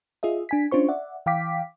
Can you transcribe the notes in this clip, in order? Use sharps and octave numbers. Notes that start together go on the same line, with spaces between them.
F4 G#4 D#5 E5
D4 G#5 B6
C#4 D4 F4 C5 C#6
D5 E5 F#5
E3 F5 G5 D6 B6